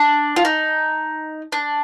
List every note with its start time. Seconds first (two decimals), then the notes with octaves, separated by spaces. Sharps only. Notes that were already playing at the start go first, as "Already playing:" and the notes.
Already playing: D4
0.36 F4
0.45 D#4
1.52 D4